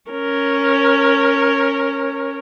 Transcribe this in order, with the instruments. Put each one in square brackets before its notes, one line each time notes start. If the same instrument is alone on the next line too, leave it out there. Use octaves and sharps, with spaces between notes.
[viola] C#4 A#4